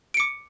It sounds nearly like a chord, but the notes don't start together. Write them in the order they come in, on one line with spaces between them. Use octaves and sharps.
D7 C#7 D6